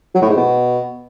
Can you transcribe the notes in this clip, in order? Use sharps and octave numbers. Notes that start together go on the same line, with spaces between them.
F#3
A2
G#2
B2